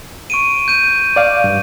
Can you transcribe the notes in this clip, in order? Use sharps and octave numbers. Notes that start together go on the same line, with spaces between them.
C#6 D7 D#7
G6 D#7
D5 F5
G2